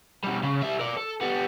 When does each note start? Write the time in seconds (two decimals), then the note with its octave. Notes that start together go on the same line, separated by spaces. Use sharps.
0.23 B2 G3
0.43 C#3
0.62 G3 E5
0.79 A#4 D5
0.97 A4
1.21 G3 B3